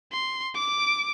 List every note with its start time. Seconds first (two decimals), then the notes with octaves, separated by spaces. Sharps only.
0.12 C6
0.55 D6 D7